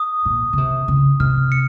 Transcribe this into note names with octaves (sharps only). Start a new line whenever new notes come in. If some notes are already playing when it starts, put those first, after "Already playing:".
Already playing: D#6
A#2
C#3
C3
C#3
C3 F6
C#7